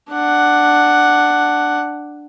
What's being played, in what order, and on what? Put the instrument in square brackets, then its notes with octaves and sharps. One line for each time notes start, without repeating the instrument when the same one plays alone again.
[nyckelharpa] D4 F#5